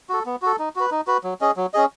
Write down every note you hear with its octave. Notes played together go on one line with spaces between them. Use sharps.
F#4 A4
B3
F#4 A4
D#4
F#4 B4
D#4
F#4 B4
F#3
C#4 G#4 D#5
F#3
C#4 G#4 D#5